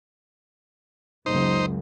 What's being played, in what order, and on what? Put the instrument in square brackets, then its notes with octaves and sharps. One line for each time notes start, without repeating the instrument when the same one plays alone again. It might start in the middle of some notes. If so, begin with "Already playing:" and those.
[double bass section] F#1 C#2 [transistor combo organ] D#4 C5